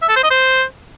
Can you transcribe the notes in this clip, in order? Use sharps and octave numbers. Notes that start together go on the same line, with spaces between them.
E5
A4
C5
D#5
C5